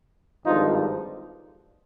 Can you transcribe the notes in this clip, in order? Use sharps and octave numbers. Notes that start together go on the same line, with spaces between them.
G#1 G2 D3 F3 D#4 F4